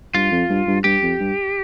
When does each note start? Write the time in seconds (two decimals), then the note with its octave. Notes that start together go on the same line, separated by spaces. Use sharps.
0.15 G2 F4
0.32 F2
0.49 G2
0.67 G2
0.84 G2 G4
1.02 F2
1.20 G2